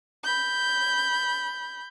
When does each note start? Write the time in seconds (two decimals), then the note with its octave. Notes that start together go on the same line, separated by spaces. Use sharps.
0.23 B5 G6